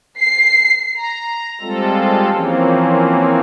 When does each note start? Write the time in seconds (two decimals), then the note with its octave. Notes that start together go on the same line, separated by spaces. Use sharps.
0.20 C7
0.95 A#5
1.61 G3 G#3 C4 F4 A4
2.32 E3 F3 A#3 C4 C#4